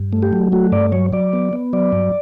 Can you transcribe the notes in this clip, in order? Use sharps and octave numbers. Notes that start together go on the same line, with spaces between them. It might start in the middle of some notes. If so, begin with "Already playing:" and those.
Already playing: G2
A3
G4
F#3
A3 F#4
G2 D5
F#3 C#5
F#3 D5
B3
B3
F#3 D5
G2